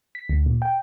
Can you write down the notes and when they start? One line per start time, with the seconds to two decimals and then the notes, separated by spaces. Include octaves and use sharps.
0.15 B6
0.29 D2
0.46 A#2
0.62 G5